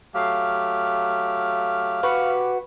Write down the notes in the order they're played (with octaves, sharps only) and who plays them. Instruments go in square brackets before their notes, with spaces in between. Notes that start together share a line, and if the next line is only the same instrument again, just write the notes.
[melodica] F#3 A3 G4 [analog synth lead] F5
[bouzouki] F#4 B4 [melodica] G4